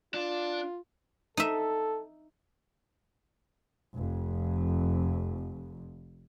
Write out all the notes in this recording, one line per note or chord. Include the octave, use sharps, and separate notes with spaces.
D4 F4
D#4 A4 E5
F1 F2